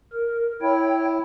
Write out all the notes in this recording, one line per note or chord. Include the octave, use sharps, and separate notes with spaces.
A#4
E4 C#5 G5